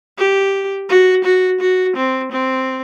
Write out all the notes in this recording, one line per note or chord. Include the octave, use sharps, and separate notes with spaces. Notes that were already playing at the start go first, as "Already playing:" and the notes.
G4
F#4
F#4
F#4
C4
C4